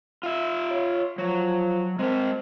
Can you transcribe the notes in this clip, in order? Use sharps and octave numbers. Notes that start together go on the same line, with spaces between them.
F4 E5
C#5
F3 F#3
G#3 C4 A#4